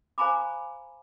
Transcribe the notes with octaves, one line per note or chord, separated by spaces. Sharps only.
C5 F5 G#5 A#5 B5 D6